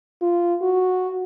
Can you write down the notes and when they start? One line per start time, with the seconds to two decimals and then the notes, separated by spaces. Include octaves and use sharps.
0.22 F4
0.62 F#4